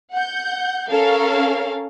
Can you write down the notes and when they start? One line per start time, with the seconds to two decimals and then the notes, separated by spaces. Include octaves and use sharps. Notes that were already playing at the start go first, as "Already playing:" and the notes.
0.12 F#5 G6
0.89 C#4 A4 A#4 F5